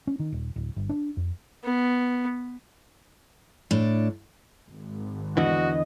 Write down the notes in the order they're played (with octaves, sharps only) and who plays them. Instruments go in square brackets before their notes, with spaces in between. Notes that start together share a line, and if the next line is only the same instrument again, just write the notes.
[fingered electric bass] C#4
D#3
D#1
D1
G1
D4
F2
[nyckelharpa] B3
[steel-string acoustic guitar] A2 D4
[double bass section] G#1
[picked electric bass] E2 D3 E3 [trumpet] F#4 [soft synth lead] D#5